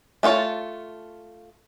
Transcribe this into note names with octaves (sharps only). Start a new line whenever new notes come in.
A3 D#4 F4 C#5 A5